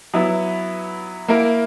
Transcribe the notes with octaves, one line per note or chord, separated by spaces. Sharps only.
F#3 B3 E4
A#3 E4 A#4